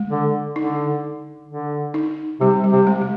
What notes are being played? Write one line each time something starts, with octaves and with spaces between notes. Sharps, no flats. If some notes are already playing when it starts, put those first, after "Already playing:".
Already playing: G#3
D3
D3 D#4
D3
D#4
C3 G3
G3
C3
G#3
G#3